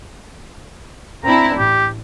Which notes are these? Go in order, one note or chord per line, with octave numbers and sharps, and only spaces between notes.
C4 D4 E4 A#5
A1 G4